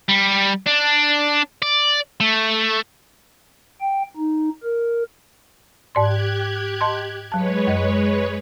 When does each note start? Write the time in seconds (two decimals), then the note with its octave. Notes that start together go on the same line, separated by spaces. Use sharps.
0.09 G3
0.67 D4
1.62 D5
2.20 A3
3.81 G5
4.16 D#4
4.64 A#4
5.95 G#2 G4 D5 C6 F#6 G#6
6.81 D#5 A5 C6
7.32 F#3 G#3 B4 C#5 A5
7.67 F#2 D#5